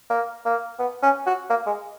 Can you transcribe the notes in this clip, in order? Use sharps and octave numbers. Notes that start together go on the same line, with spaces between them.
A#3
A#3
B3
C#4
F#4
A#3
G#3